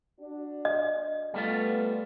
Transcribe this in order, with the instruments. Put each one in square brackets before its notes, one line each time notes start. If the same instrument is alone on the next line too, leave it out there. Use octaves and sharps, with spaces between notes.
[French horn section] D4 F#4
[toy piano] D#5
[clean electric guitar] G3 A3 F4 [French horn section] B3